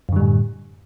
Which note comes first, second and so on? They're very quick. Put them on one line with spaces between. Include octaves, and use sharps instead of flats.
F#2 D3 G3 A2